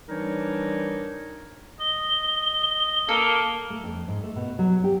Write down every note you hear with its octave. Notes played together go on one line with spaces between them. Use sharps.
E3 G3 D4 D#4 A#4 C#5
D#5 G7
A#3 A4
A3
F2
G#2
A3
B2
F#3
G4